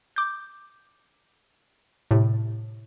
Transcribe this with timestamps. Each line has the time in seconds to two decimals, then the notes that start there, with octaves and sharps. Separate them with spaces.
0.16 D6 G6
2.11 A2 C3